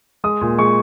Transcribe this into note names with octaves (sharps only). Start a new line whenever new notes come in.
G#3 D#6
A#2
G#3 C#6